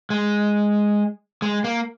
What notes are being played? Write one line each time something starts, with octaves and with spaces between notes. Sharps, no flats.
G#3
G#3
A#3